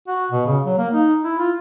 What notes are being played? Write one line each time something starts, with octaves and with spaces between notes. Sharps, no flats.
F#4
B2
C#3
F#3
A#3
D#4
E4
F4